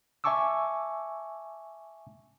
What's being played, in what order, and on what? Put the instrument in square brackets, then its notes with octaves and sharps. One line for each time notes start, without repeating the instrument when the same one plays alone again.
[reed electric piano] E5 G#5 A5 C#6 D6 E6